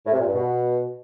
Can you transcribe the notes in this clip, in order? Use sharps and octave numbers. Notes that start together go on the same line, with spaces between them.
A2
C3
A#2
G2
B2